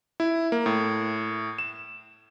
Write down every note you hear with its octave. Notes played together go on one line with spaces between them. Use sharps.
E4
A#3
A2
E7